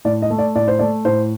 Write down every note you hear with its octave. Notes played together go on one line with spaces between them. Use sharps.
A2 D5
D#5
A3
D5
A2 D5
C5
A3 D5
A2 C5